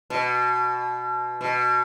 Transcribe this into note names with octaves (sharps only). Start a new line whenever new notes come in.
B2
B2